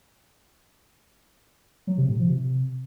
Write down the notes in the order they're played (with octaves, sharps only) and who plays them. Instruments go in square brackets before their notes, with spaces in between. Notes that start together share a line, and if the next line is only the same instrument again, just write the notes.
[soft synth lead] F#3
C3
A2
F3
C3